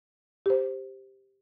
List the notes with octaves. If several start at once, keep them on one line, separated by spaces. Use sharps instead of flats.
G4 C5